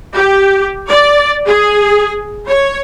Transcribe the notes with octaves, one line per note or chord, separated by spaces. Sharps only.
G4
D5
G#4
C#5